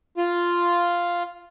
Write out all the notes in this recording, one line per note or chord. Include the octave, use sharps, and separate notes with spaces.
F4